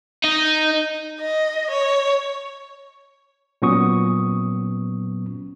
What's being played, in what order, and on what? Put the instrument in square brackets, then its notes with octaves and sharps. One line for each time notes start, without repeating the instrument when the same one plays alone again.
[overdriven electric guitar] D#4
[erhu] D#5
C#5
[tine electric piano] A#2 F#3 B3 C#4 C#6 D#6